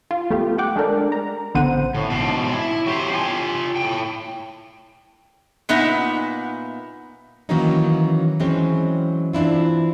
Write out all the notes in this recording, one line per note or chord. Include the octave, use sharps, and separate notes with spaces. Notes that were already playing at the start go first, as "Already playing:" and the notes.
F4
A3 B3 F4 G4
F#5 G5 D6 F#6
G#3 D4 A4 A#4 D5
A#5
A1 D3 B3 C5 F#5 D#7
A2
G#2 B2 C4 D4
E4
F#3 G4 C5
F4 G5 G#5
A2 G5
A#2 B3 D#4 E5 F#5
D#3 E3 F#3 A#3 C#4 D#4
E3 F#3 G#3 C4 C#4
E3 C4 D4 E4 F4